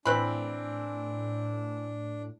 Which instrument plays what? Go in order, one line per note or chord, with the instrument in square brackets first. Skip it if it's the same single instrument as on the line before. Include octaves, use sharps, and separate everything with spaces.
[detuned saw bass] A2 [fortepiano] E3 C4 [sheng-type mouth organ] D4 [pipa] B4 B5